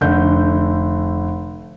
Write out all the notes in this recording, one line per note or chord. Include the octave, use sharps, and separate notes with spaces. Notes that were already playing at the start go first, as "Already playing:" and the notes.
F1 D3 G6